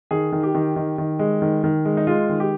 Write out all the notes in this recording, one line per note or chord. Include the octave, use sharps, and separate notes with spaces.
D#3 G#4
D#3
G4
D#3
D#3
D#3
G#3
D#3
D#3
G#3
D#4
G#3 F4
D#3
G4